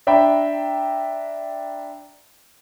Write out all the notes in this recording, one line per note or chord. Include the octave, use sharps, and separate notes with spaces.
D4 E5 G5 A#5 B5